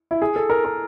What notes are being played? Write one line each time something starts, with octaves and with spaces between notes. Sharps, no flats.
E4
G#4
A4
A#4
A#4